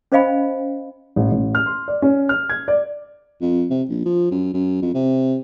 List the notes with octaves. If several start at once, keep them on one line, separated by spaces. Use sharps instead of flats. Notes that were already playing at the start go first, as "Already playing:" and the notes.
C#4 C5 D#5 F5 G5 B5
A1
A1
F6
C6
D5
C#4
F6
G#6
D5
F2
C3
A#1
F3
F#2
F#2
F2
C3